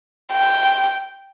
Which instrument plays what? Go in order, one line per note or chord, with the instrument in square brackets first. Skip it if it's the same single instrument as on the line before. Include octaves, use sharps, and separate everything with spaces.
[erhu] G5